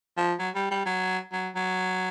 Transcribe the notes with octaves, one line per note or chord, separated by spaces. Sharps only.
F3
F#3
G3
G3
F#3
F#3
F#3